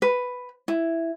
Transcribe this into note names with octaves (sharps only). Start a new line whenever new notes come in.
B4
E4